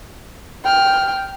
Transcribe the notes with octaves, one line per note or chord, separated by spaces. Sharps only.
G5 F6